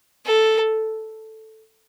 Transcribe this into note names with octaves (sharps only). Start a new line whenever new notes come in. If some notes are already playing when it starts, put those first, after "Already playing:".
A4